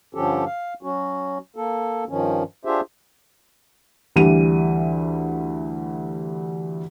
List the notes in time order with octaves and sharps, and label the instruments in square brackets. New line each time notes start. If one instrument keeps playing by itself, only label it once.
[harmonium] G2 D3 F3 C#4 G4 A4
F5
F#3 C#4 F#4
A#3 A4
G2 D#3 F3 C#4
D4 F4 G4 G#4 C5 E5
[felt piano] D2 E3 G3 D#7